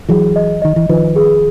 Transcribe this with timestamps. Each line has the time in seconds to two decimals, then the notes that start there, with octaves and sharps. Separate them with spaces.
0.09 E3 F#3 G#4
0.36 D#5
0.62 D#3 D#5
0.76 E3
0.89 D#3 F3 B4
1.16 G#4